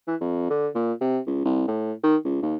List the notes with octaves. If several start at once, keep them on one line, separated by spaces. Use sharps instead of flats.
E3
F2
D3
A#2
C3
C#2
C2
A2
D#3
C#2
D#2